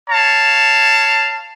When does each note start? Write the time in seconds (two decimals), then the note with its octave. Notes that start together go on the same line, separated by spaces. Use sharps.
0.10 C#5 F5 A5